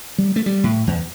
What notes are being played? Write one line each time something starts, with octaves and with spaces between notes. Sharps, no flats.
G3
A3
G3
A2
E2